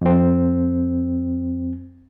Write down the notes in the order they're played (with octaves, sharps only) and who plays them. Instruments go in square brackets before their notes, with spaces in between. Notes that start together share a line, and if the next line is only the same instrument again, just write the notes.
[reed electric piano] F2 C4